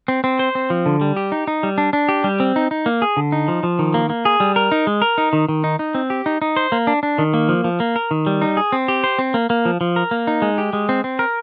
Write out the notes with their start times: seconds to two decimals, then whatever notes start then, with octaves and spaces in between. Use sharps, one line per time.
0.08 C4
0.24 C4
0.39 C5
0.55 C4
0.70 F3
0.86 D3
1.01 G3
1.17 G4
1.32 D#4
1.47 D#4
1.63 G3
1.78 D4
1.93 D4
2.09 G4
2.24 G3
2.40 C4
2.56 D#4
2.71 D#4
2.86 A#3
3.02 G#4
3.17 D3
3.32 D#4
3.48 F3
3.63 F3
3.79 D#3
3.94 A#3
4.10 A#3
4.25 G#4
4.40 G3
4.56 A#4
4.72 D#4
4.87 G#3
5.02 A#4
5.18 D#4
5.33 D#3
5.49 D#3
5.64 D#4
5.79 D#4
5.95 C4
6.10 G4
6.26 D#4
6.42 D#4
6.56 C5
6.72 A#3
6.87 D4
7.03 D4
7.18 D#3
7.34 A#3
7.49 F3
7.64 F3
7.80 A#3
7.96 A#4
8.11 D#3
8.27 G3
8.42 D#4
8.57 G#4
8.72 C4
8.88 G4
9.04 C5
9.19 C4
9.34 A#3
9.50 A#3
9.65 F3
9.81 F3
9.96 A#4
10.11 A#3
10.27 D#4
10.42 G#3
10.58 G4
10.73 G#3
10.89 C4
11.04 C4
11.19 A#4